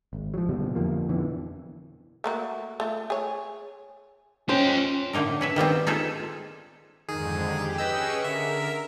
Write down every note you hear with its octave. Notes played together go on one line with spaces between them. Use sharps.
G#1
F3 F#3
F#1 B2 D3 G3
F2 D3 F3 A#3
F2 B2 D3 E3
A3 A#3 F#4
A3 F4
G#4 C#5
C#4 F4 C5 G5
A2 D3 A#3 D#4 A#4
C#4 B4 E5
D#3 G3 B3 C4
D#4 F4 G#4 A4 B4
F2 G#2 D3 D#3 G#4
G4
C#4 G#4 B4 D#5 G5 E6 C#7
D3 A#4 E5